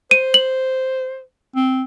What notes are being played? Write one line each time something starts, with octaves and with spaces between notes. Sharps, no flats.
C5 D#7
F#7
C4